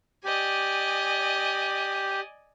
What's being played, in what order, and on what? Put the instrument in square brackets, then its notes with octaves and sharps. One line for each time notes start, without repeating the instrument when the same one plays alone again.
[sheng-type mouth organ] G4 [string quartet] D5 D#5 G#5